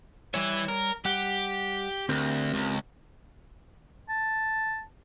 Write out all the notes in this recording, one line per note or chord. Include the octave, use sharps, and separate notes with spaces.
E3 G3 C#5 E5
A#4
G3 G4 F#5
D2 C4 G4 A#4
C#2
A5